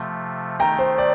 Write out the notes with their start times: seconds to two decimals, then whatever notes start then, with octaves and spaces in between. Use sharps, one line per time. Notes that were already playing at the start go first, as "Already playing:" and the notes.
Already playing: C3 F3 A3
0.60 D#3 A3 D#4 G5 A#5
0.79 C5
0.98 D5